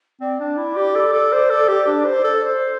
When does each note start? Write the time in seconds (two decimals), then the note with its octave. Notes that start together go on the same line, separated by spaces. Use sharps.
0.21 C4 D5
0.40 D4
0.58 E4
0.76 G4
0.96 A4
1.13 A4
1.33 C5
1.50 A4
1.69 G4
1.87 D4
2.06 C5
2.24 A4
2.43 C5